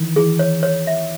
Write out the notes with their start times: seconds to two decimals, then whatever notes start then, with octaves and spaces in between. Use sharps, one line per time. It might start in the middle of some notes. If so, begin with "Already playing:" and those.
Already playing: D#3 E3
0.16 E3 G#4
0.39 C#5
0.63 C#5
0.87 E5